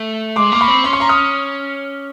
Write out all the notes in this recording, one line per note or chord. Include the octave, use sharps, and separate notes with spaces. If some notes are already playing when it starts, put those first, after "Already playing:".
Already playing: A3
G#3 C6 D6
A#3 D6
B5 C#6
C4
C#4 C6
C#6
A#5 C6
D#6 F6